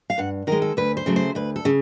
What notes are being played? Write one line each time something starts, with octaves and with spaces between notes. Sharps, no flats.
F5
G2 F#5
D#3 G#3 A#4
A4
D2 B4
C5
C#3 F#3 A3
C5
D2 B4
A4
C#3